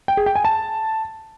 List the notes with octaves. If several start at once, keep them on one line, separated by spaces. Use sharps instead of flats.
G5
G#4
G5
G#5
A5